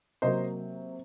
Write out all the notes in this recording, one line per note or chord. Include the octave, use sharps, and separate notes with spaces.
C3 F#3 A#3 C5 D#5